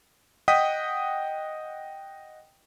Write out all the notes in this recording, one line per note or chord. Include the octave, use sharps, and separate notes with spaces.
D#5 F#5 G5 D#6 B6